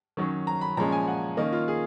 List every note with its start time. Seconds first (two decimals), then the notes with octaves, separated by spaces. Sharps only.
0.17 D#3 F#3 C#4
0.47 A#5
0.61 B5
0.77 A#2 F3 G#3 C#4 A#5
0.92 G#5
1.07 F#5
1.37 D#3 A#3 C#4 D#5
1.53 F4
1.68 G#4